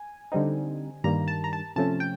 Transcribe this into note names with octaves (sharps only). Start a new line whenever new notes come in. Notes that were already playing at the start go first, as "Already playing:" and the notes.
Already playing: G#5
D3 G3 C4 D#4
G2 D#3 G3 A#3 A#5
A5
A#5
A5
C3 F3 A3 C#4 A5
G5